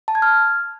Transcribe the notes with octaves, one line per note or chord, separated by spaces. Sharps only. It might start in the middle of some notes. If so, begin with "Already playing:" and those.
A5
G#6
F6